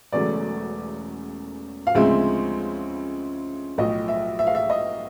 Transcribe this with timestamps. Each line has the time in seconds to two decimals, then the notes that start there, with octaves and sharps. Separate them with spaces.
0.12 E1 E2 C#3 F#3 A3 D5
1.87 F5
1.95 D2 C#3 F3 G#3 C4 E5
3.77 B1 A2 F3 D#5
4.08 E5
4.39 E5
4.47 F5
4.55 E5
4.70 D#5